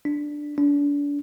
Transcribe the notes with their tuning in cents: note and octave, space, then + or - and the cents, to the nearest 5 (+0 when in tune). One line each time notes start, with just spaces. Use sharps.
D4 +5
D4 -35